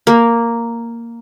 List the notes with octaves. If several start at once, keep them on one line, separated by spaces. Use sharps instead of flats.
A#3